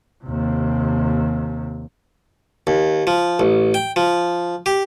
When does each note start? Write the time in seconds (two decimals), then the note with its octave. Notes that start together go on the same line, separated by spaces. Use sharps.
0.24 D#2 C3
2.67 D#2
3.07 F3
3.40 A1
3.74 G5
3.96 F3
4.66 G4